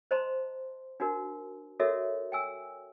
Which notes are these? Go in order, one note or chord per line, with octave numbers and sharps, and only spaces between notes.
C5 D#5 A5 A#5 C6
D4 D#4 F#4 A#4
F#4 A4 A#4 C#5 D#5 E5
G5 G#5 E6